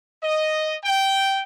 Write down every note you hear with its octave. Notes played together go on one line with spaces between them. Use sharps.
D#5
G5